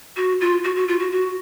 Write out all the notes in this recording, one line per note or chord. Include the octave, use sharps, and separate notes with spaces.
F#4
F4
F#4
F#4
F4
F#4
F#4